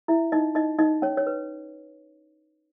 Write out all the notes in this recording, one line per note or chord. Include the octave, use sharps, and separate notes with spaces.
E4 E5
D#4 D#5
D#4 D#5
D#4 D#5
C#4 C#5
C#5
B4